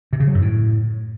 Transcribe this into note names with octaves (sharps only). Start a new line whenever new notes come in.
C3
C#3
F#3
F#2
A2